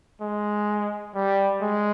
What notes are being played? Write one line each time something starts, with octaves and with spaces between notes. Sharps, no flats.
G#3
G3
G#3